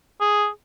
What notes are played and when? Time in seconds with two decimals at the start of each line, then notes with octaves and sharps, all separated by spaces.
0.21 G#4